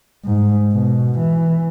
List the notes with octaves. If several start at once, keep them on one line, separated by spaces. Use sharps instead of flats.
G#2
B2
E3